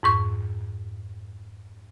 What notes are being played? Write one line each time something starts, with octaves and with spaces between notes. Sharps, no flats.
F2 G#2 C#6